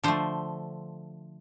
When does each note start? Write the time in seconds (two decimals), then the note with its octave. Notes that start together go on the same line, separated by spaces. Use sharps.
0.04 D3 F3 A3 C5